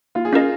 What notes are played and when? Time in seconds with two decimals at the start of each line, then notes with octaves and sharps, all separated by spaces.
0.15 A#3 F4
0.25 G#4
0.33 C#4 F4 A#4 D#5